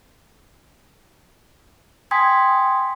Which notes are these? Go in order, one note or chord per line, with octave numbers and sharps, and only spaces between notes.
G5 G#5 C6 D#6 G#6 B6